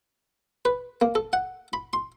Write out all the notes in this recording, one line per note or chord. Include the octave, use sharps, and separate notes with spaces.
B4
A#3
A4
F#5
B5
C6